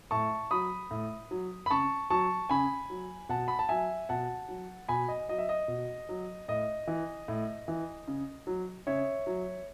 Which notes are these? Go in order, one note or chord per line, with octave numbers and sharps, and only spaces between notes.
A2 A5 C#6
F#3 B5 D#6
A2
F#3
B5
C#3 A5 C#6
F#3 A5 C#6
C#3 G#5 B5
F#3
B2 F#5 A5
B5
A5
F#3 E5 G#5
B2 F#5 A5
F#3
B2 G#5 B5
D#5
F#3 D#5
E5
D#5
B2
F#3
A2 D#5
E3
A2
E3
C#3
F#3
C#3 C#5 E5
F#3